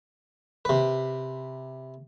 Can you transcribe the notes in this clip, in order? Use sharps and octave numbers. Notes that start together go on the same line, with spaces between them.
C3 B4